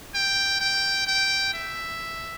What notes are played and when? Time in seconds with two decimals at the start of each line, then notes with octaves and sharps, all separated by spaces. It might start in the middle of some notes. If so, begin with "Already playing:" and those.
0.15 G5
0.61 G5
1.07 G5
1.54 E5